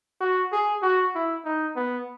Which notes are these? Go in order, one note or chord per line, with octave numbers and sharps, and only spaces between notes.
F#4
G#4
F#4
E4
D#4
B3